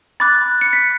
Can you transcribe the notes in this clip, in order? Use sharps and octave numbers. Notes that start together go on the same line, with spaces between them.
B5 D6 F#6 A6
C#7
B6